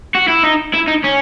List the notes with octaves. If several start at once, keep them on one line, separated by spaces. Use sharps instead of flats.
F#4
E4
D#4
E4
D#4
C#4